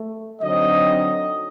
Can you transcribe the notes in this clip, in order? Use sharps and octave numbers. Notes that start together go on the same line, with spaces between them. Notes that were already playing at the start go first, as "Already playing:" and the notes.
Already playing: A3
D3 F#3 C4 D#4 D#5